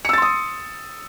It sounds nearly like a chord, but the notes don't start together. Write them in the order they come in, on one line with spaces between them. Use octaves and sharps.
C#7 E6 A6 C6 D#6